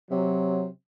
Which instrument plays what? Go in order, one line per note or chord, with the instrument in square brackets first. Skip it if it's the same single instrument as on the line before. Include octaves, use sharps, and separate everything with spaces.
[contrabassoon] C3 [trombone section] F#3